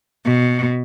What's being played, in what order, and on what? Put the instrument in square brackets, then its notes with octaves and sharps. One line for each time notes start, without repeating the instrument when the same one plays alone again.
[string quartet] B2